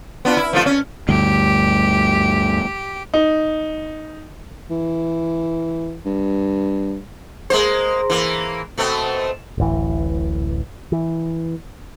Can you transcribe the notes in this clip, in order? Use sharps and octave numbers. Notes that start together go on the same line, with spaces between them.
B3 D4 F4
E4
F3 A3 F4
C#4
D2 G2 G4
D#4
E3
G2
G#3 A#3 C5
E3 A#3
B2 A3 C4
D1 A1 E3
E3